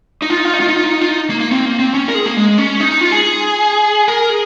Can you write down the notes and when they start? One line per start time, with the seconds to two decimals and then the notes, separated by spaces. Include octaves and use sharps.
0.22 D#4
0.30 F4
0.37 D#4
0.45 F4
0.53 D#4
0.60 F4
0.68 D#4
0.76 F4
0.84 D#4
1.02 F4
1.08 D#4
1.30 A#3
1.40 A#3
1.51 C4
1.65 A#3
1.79 C4
1.94 C#4
2.09 A#4
2.15 G#4
2.26 A#3
2.37 G#3
2.58 C#4
2.80 D#4
2.91 D#4
3.01 F4
3.11 G#4
4.08 A#4
4.29 G#4